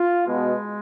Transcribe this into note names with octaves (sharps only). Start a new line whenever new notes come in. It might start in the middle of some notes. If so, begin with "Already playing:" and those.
Already playing: F4
B2 G#3